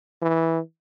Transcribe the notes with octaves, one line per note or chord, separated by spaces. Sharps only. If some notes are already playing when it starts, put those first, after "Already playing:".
E3